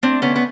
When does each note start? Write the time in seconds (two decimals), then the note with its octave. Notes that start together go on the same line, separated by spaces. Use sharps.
0.03 A3 C4 D4
0.22 D3 B3 C#4
0.36 B3